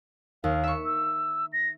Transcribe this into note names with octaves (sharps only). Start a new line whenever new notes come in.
D#2 F5
E5 C#6
E6
A#6